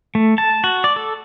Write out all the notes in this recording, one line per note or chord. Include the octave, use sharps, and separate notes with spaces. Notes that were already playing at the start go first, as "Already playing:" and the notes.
A3
A5
F#4
D5
A4